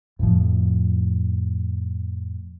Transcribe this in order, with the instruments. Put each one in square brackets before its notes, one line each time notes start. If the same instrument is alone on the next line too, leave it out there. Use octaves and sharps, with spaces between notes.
[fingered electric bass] F2 A2 F3